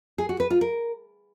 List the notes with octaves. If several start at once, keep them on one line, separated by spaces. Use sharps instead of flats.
G#4
F#4
B4
F4
A#4